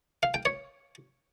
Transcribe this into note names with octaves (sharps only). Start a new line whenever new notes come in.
F5
G5
C#5